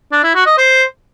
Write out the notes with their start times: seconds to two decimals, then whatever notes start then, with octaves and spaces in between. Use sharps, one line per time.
0.12 D4
0.24 E4
0.35 F#4
0.47 D#5
0.58 C5